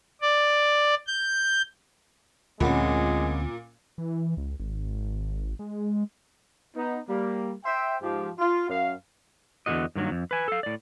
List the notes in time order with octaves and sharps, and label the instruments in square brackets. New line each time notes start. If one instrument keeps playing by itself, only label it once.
[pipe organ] D5
G6
[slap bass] D2 C4 [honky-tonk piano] A#2 [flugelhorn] G#3 [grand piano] C#4 F#5 B5
[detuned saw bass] E3
C#2
G#1
G#3
[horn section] B3 D#4
G3 A#3
C5 E5 G5
G#2 F3 G4
F4
F#2 F5
[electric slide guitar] E2 G2 D3 F#4 D#5
G2 D#3 F#3 A#3
F2
B4 G#5
A4 F5
A2 D5